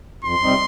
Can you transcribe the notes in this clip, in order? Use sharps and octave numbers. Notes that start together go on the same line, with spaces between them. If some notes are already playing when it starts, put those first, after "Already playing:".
F2 C6
C3 G3 C4 D#4